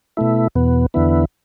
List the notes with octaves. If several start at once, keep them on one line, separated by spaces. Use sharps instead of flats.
B2 A3 E4
E2 B2 B3
E2 D3 B3 E4